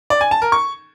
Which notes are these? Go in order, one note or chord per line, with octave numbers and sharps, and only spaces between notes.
D5
G#5
A5
A#4
C#6